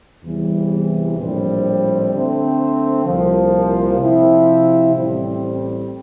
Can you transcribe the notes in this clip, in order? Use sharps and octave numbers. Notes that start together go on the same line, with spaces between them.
E2 C3 E3 G3
A#1 A2 G3 C4
D3 A3 C4
C2 A#2 F3
C3 F3 C4 E4
A1 A2 G3 C4